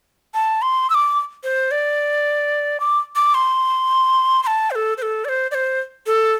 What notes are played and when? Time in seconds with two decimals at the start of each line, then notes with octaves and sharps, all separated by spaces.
0.34 A5
0.62 C6
0.90 E6
0.94 D6
1.44 C5
1.71 D5
2.80 D6
3.16 D6
3.34 C6
4.43 C6
4.47 A5
4.71 C5
4.75 A4
4.98 C5
5.02 A4
5.25 D5
5.29 C5
5.51 D5
5.54 C5
6.06 A4